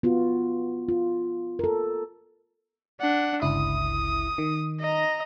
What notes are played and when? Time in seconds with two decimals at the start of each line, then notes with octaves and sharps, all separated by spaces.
0.03 B3 F4 F#4
0.89 F4
1.59 A4 A#4
3.00 D4 F#5
3.42 G1 C#2 E4 D#6
4.38 D#3
4.80 D#5 A#5